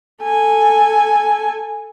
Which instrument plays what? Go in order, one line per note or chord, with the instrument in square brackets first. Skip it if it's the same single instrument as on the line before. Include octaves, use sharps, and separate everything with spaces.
[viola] A4 G#5